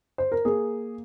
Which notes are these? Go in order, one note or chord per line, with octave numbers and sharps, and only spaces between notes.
C5
A#4
A#3 G#4